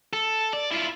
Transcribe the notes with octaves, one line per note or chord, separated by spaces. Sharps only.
A4
D5
E4 F4